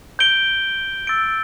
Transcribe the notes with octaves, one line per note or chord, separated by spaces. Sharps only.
G6 D7 G7
E6 A6 D7